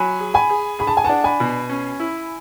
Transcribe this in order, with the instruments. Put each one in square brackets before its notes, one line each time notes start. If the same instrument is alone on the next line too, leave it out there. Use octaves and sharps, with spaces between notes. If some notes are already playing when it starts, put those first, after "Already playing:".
Already playing: [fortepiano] F#3 [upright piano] G#5 B5
[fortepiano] G#4
[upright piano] G#5 B5
[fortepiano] G#4
[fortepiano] G#4 [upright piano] B5
[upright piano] A5
G#5
[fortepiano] D4 [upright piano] F#5 A5
[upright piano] G#5 B5
[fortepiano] B2
C#4
E4